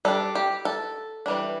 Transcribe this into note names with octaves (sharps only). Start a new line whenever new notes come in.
G3 D4 A4
G4
A4
E3 G3 D4